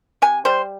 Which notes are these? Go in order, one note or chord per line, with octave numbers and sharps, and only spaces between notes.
C3 G#5
G3 C5